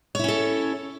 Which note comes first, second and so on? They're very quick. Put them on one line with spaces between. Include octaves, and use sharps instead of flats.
C#5 E4 C#4 A4